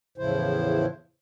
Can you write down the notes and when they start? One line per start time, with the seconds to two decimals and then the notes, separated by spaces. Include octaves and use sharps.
0.18 E2 A2 C#3 F3 E4 C5